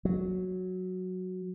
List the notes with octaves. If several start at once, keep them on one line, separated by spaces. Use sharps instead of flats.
F#3